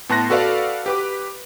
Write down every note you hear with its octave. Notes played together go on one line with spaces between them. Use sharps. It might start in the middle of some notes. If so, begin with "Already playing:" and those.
A2 B3 A5 C6 F#6 A#6
F#4 A4 B4 D5 F5 F#5
G4 B4 D6